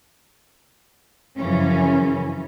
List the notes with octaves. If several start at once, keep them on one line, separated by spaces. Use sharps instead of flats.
F#2 C#3 E3 F3 C#4